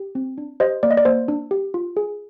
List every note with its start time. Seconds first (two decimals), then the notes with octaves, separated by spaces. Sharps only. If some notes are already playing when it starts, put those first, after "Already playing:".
Already playing: G4
0.15 C4
0.38 D4
0.60 G4 C5 D#5
0.83 A#3 D5
0.91 D#5
0.97 D5
1.05 A#3 C5
1.28 D4
1.51 G4
1.74 F4
1.97 G#4